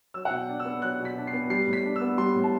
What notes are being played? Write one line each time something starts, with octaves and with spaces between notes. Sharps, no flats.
F#3 E6
F#5
B2
G5
D4
E6
B3
F#3 F#6
B2
B6
D4
C7
B3
G3 C7
A2
B6
D4
E6
B3
G3 C6
A2
A5